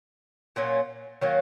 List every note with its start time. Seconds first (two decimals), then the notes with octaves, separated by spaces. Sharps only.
0.56 A#2 F#3 A#3 C#4
1.21 D#3 F#3 A#3 C#4